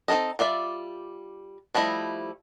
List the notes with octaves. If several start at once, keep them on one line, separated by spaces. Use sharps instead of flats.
C4 D#4 E4 A4 D#5
G3 F4 D5 E5
F3 G3 A3 E4 D#5